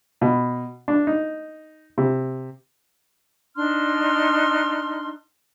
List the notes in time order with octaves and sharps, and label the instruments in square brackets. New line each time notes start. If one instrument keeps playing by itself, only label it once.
[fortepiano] B2
D4
D#4
C3
[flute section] D4 D#4 C6 F6